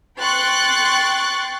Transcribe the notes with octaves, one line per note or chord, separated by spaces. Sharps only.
G5 C6 C#6 F#6 A6